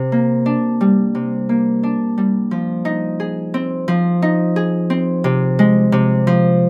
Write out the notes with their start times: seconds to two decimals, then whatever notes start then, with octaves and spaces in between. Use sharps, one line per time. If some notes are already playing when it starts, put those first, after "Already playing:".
Already playing: C3
0.12 A#3
0.46 D4
0.81 G3
1.15 C3
1.49 A#3
1.83 D4
2.18 G3
2.51 F3
2.85 D#4
3.20 G#4
3.54 C4
3.88 F3
4.22 D#4
4.56 G#4
4.90 C4
5.24 C3
5.59 G#3
5.92 C3
6.27 F3